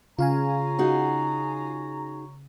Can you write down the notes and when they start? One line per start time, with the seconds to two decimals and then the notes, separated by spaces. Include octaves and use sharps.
0.19 C#3 F4 C#5 F5 G#5 A#5
0.79 D#4 F#4 G#4